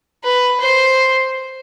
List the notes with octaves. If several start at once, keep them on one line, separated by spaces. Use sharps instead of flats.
B4
C5